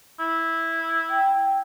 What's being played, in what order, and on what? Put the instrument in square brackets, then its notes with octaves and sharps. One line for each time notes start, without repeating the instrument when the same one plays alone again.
[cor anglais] E4
[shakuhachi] G5